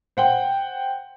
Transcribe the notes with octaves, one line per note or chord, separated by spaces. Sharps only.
C5 F#5 G5